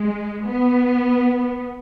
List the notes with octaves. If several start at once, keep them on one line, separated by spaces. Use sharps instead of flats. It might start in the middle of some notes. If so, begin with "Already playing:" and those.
Already playing: G#3
B3